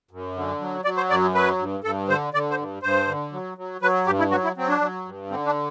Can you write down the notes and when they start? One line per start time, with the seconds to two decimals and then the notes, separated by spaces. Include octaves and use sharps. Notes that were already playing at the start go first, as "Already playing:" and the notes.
0.11 F#2
0.35 D3
0.60 F#3
0.84 F#3 D5
0.97 C5
1.10 F#2 D5
1.34 F#3 B4
1.59 G2
1.84 G2 A4
2.08 D3 C5
2.34 D3 D5
2.51 C5
2.58 G2
2.82 G2 C5
3.08 D3
3.32 F#3
3.58 F#3
3.81 F#3 B4
4.06 G2 G4
4.19 E4
4.31 F#3 F#4
4.44 E4
4.56 F#3 C4
4.68 D4
4.81 F#3
5.05 G2
5.30 D3 C4
5.46 D4